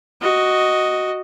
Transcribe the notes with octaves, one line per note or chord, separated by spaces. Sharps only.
F#4 D#5